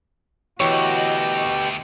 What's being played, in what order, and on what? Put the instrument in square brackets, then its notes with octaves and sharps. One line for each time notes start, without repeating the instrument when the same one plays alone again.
[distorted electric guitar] D2 [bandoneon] B2 G4 [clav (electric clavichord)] E3 C#5 [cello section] F#4 D#5